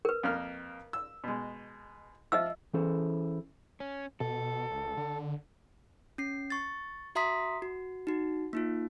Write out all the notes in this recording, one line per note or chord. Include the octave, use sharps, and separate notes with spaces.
A#4 B4
F2 A#3 F6
E6
B2 G#3
F3 D#5 E5 E6
E3 C#4 E4 G#4 A4 C5
C#4
B2 A4
C#2
D3
C#4 C7
C#6 A6
F#4 E5 A#5 C6 D#6 B6
F#4
D#4 F#4
A#3 D#4 F4